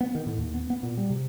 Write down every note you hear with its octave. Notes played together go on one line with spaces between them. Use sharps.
B3
D#3
A2
D#2
B3
B3
A#2
G3
C3